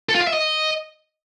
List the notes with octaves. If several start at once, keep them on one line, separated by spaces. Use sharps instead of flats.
A4
F4
F5
E5
D#5